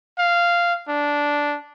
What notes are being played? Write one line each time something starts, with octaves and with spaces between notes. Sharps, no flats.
F5
D4